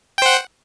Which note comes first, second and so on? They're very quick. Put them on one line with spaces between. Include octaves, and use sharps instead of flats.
G5 C5 F#5